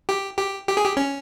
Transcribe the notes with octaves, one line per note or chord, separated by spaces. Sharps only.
G4
G4
G4
G#4
G4
C#4